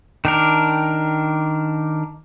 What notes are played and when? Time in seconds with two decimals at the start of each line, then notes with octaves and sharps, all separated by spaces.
0.25 D#3 D4 A#4